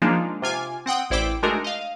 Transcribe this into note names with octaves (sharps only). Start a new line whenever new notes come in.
F3 G#3 A#3 D4 D#4 F4
C3 F4 G#5 D6
C4 F#5 G5 D#6
A1 E4 C5 D5 G5 D6
G#3 A3 D4 D#4 F#4 A#4
D#5 F5